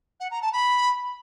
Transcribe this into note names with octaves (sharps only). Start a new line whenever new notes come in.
F#5
A#5
A5
B5